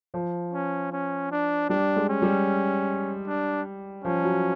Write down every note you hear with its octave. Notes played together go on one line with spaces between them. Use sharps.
F3
C#4
C#4
D4
G3 D4
G#3
C#4
G3
D4
F3 C#4
F#3